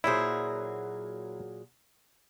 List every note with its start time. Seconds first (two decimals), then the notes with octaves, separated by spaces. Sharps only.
0.04 A#2 F#3 E4 G#4 C5